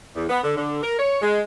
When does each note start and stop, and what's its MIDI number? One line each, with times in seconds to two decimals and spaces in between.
0.15 0.24 40
0.29 0.41 59
0.44 0.55 50
0.57 0.79 50
0.83 0.98 70
0.99 1.19 73
1.21 1.40 56